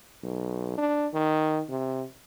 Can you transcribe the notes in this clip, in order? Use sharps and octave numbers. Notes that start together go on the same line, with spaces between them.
B1
D4
D#3
C3